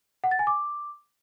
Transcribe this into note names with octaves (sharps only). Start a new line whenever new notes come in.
F#5
A6
G#5
D6